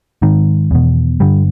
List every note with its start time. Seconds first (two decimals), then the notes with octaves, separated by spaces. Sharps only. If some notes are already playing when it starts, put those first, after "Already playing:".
0.22 G#2 D#3
0.71 E2 B2
1.20 G2 D3 G3